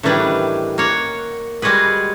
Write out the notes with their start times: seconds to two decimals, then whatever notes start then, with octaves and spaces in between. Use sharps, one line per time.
0.03 A2 D#3 E3 G3 D4 B4
0.78 A#3 C#5 F#5
1.62 G3 G#3 F#4 G#4 B4